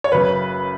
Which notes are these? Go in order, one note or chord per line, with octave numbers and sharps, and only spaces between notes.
C#5
F#1 F#2 C#3 B4